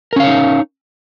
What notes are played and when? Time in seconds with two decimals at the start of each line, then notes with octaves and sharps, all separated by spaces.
0.13 A#4
0.16 C#4
0.20 F5
0.24 C#5
0.27 D#4